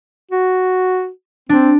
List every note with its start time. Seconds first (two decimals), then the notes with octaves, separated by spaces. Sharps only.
0.31 F#4
1.49 C4 D4